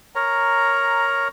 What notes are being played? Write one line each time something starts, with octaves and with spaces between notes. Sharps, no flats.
A#4 C#5 A#5